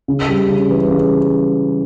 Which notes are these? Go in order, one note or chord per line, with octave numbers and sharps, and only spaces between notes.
C#3
G3
C#3
E3
C#3